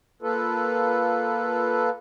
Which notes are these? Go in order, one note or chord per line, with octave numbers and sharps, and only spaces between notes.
A#3 F4 A4 B4